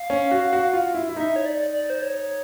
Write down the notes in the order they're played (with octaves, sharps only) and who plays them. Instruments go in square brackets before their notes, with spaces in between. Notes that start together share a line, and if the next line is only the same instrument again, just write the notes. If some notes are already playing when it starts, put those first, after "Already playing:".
Already playing: [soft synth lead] F5
[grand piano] C#4
F#4
F#4
F4
E4
E4
[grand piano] D#4 [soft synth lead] E5
[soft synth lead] C#5
D5
D5
C5
C#5